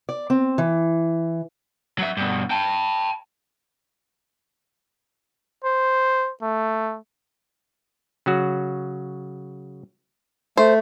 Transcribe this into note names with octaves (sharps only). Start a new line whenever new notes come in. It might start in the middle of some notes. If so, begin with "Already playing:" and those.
D5
C4
E3
F#3 E5
G2 B2
G5 A5
C5
A3
C#3 F#3 F#4
A3 C5